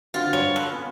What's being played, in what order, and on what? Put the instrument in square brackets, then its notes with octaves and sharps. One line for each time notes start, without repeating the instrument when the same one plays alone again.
[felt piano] D3 F#4 [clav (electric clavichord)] C4 [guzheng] F4
[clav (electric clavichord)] G2 [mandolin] C#5
[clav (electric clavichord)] A4 B4 [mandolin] F#6
[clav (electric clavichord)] B3 C#4